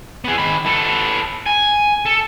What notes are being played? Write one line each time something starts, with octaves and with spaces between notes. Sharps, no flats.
B3 G#4
D#3 B5
B3 A4
G#5
A4